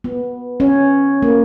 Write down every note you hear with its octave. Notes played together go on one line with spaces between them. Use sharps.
B3
C#4
A#3